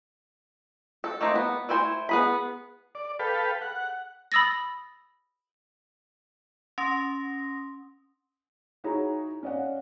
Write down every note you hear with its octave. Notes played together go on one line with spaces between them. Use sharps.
A4
A3 A#3 C4 D#4
B3
A3 E4 C5 G#5
B3 G#4 B5
D5
A4 B4 F5 G5
F#5
B5 D#6 E6 A6 A#6
C#4 C6 D#6 A#6
D#4 E4 F#4 G#4 C#5 A#5
C#4 D5 D#5 F5 F#5